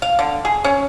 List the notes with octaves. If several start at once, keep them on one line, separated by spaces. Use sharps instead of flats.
F5
D3
G#4
C#4